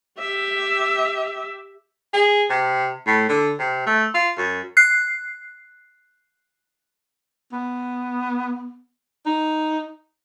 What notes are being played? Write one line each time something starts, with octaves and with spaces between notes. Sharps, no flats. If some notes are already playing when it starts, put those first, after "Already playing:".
G4 E5
G#4
C3
A2
D3
C3
A3
F4
F#2
F#6 C7
B3
D#4